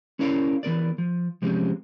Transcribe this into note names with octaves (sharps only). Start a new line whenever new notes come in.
C#4 E4 A#4 C#5 D5 F5
E3 B3 A#4 D5
F3
C3 F3 G#3 C4 C#4 G4